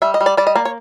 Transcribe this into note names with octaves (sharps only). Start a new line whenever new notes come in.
G3 E5
D#5
G3
D5
G3 D5
D#5
A#3 D5
C#5